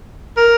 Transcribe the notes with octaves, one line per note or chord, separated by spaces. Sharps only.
A#4